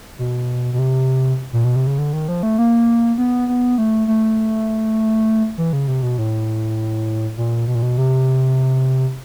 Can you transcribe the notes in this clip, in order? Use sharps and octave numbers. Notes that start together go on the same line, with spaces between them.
B2
B2
C3
A#2
B2
C3
C#3
D3
D#3
F3
A3
A#3
B3
B3
A3
A3
E3
C#3
C3
B2
A2
A#2
B2
A#2
B2
C3